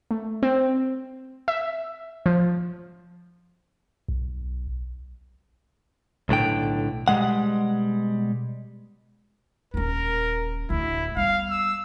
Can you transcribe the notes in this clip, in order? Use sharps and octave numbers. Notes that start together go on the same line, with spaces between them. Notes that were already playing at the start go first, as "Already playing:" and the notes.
A3
C4
E5
F3
B1
B1 A2 D3 G5
B2 G3 G#3 F#5
D#1 C#4 A#4
D1 D2 E4
G3 B3 F5
E6